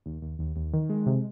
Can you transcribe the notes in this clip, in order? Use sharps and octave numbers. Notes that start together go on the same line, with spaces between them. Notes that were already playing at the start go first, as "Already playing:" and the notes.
D#2
D#2
D#2
D#2
D#3
G#3
C3